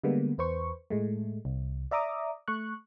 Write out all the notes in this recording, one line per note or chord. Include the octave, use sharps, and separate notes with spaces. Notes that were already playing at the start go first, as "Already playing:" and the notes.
D3 G3 G#3 A#3 B3
E2 B4 C5 C#6
A2 G#3 A3
C2
D5 E5 A#5 D6 D#6
A3 C#6 F#6